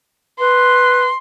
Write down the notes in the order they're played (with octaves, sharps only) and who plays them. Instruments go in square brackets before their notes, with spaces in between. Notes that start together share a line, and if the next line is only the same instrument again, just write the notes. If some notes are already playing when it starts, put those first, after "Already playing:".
[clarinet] B4 [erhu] C6